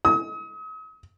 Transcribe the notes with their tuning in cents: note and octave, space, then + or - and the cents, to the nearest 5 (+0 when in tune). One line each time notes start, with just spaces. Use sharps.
D#6 +40